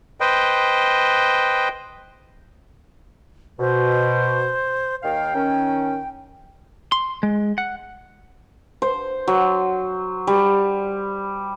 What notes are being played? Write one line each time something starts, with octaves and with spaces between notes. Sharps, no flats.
B4 C5 D#5 G5
B2 C5
D#2 D#3 F5 G5
D#3 C#4
C6
G#3
F#5
C5
F#3
G3